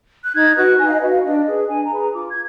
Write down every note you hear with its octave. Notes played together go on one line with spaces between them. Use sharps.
F#6
D#4 G#6
F#4 B4 F#6
D#4 G#5
F5
D#5
F#4 B4
F5
D4 D#5
D#5
G#4 B4
D4 G#5
A#5
G#4 B4 B5
A#5
F4 D6
G#6